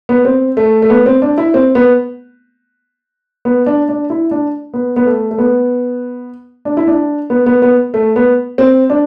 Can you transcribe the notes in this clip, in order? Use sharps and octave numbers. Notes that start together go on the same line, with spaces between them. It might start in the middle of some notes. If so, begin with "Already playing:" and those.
B3
C4
A3
A3
B3
C4
D4
E4
C4
B3
B3
D4
D4
E4
D4
B3
B3
A3
A3
B3
D4
E4
D4
B3
B3
B3
A3
B3
C4
D4